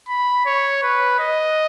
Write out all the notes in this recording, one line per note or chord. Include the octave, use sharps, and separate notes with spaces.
B5
C#5
B4
D#5